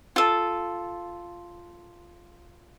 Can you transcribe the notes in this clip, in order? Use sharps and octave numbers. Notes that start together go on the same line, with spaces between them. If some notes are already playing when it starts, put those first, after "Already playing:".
F4 A4